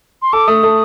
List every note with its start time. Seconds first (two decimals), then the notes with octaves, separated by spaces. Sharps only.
0.22 C6
0.32 A4 D6
0.47 A3 D#6
0.63 A3